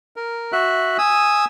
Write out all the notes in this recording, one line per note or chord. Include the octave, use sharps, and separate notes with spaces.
A#4
F#4 E5 F#6
G#5 D#6 E6